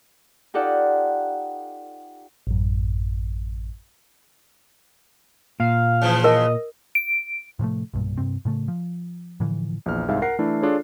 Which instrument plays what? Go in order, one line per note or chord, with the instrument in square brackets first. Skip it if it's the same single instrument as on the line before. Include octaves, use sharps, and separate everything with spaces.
[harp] D#4 F4 G4 A4 D5 F#5
[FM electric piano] A1 F#2
[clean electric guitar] A#2 [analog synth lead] F5
[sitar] C#3 E3 F3
[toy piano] A#4 [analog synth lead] D#5
[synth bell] D7
[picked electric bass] A2 C3 F3 A3
B1 G2 A#2
G2 C3 C4
A2 C#3 A3
F3
A2 D3 E3 F3
[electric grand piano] A#1 E2 F6
C2 G#2 E5 F5
A#4 F#5 C7
E3 A3 D4 E4
D4 F4 G#4 A4 C#5 D5